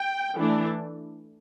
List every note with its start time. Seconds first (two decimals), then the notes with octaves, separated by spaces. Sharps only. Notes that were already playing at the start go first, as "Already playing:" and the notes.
Already playing: G5
0.37 E3 A3 D4